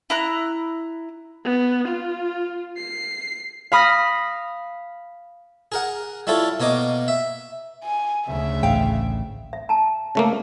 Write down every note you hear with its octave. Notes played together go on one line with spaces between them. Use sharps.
E4 A#5 F#6
B3
F4
C7
F5 B5 D#6 F6 A#6
G#4 A#4 F#5
G3 E4 F4 A4 C#5
B2 A#3 C#5 D#5 D6
E5
G#5
D2 C#3 E5
A1 F5 G5
E5
A5 A#5
C#3 A3 A#3